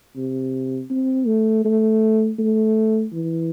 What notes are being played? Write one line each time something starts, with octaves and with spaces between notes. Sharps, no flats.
C3
C4
A3
A3
A3
E3